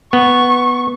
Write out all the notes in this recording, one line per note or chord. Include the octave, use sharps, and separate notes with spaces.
B3 C#6